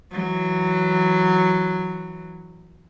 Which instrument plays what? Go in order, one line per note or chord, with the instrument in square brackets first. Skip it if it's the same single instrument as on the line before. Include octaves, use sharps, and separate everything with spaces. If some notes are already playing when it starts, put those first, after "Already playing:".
[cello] E3 F#3